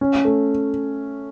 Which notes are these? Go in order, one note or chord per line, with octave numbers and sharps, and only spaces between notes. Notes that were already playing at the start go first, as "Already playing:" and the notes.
C#4
A3